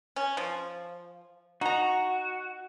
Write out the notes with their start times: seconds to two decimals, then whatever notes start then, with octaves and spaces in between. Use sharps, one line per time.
0.16 C#4
0.37 F3
1.61 D#4 F#4 A#5